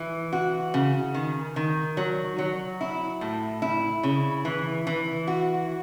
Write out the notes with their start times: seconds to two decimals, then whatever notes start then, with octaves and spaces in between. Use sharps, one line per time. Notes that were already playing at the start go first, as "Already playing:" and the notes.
Already playing: E3
0.33 F#4
0.74 C#3
1.14 D#3
1.56 D#3
1.97 F#3
2.38 F#3
2.81 E4
3.21 A2
3.62 E4
4.03 C#3
4.45 E3
4.87 E3
5.27 F#4